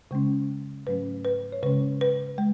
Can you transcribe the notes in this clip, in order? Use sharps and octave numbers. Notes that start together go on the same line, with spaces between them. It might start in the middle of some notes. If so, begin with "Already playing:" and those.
C#3 G#3 C#4
G#2 F#3 A3 C#4 B4
B4
C#5
C#3 G#3 C#4 B4
B4
G#3